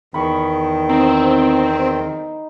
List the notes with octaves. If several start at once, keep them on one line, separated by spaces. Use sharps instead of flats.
E2 D#3 B5 C#6
C4 D#4